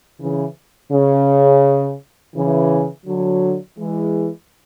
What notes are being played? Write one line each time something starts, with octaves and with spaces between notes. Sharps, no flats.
C#3 E3
C#3
C#3 E3
D3 F#3
E3 G#3